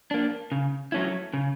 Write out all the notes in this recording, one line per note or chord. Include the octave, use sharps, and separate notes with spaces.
A#3 D4
C#3
F#3 A3 C#4 E4
C#3